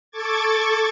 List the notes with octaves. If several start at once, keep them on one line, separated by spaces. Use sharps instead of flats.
A4 C#6 D6 G#6 A6